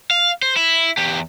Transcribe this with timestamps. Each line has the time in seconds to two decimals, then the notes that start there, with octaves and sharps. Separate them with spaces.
0.11 F5
0.42 C5
0.56 E4
0.97 E2 G4